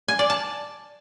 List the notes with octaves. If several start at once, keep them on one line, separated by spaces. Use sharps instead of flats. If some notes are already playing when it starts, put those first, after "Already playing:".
G#5
D5
A5